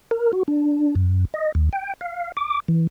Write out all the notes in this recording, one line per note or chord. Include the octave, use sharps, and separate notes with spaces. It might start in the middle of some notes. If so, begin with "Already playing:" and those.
A#4
F#4
D4
F#2
D#5
D#2
G5
F5
D6
E3